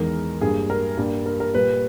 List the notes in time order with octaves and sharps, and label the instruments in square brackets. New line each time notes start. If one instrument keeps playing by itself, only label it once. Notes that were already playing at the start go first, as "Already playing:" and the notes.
Already playing: [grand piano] E2 D#3 G#3 A#4
G2 G3 A#3 G#4
A#4
G2 G3 A#3
A#4
A#4
A#2 G3 A#3 B4